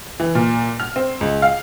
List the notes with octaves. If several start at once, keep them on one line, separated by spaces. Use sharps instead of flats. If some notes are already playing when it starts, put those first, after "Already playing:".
E3
A#2
F6
C4
C#2
F5